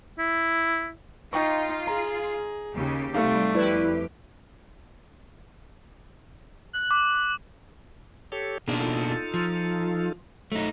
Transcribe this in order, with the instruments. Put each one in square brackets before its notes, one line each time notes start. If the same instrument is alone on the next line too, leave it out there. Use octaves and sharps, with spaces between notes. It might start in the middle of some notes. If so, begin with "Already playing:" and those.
[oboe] E4
[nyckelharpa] D#4 [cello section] F4 [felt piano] G5 C#6
[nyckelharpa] G#4 [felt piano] A#5
[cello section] D#2 C#3 G4
[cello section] C3 G3 [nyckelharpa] A3 [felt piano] D#4 F5
[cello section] F2 G4 [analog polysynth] E4 B4 [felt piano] D5
[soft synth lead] F#6
[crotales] D6
[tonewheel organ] G4 A4 C#5
[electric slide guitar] B2 A#3 D4 [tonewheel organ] D#4 G#4
[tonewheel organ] D#4 F4 A4
[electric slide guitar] F3
[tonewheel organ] F#3 [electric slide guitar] A3 D#4